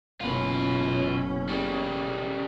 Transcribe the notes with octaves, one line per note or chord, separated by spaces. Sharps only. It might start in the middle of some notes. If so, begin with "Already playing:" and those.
F#1 B2 C#4 F4 B4
C#3 G3